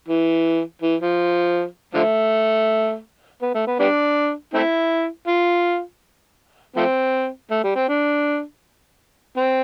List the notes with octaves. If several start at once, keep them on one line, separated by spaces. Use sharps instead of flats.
E3
E3
F3
D3 F3 A3
B3
A3
B3
G3 B3 D4
A3 C4 E4
F4
F3 A3 C4
A3
G3
C4
D4
C4